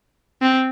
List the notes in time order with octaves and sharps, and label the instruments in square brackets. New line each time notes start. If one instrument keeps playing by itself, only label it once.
[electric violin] C4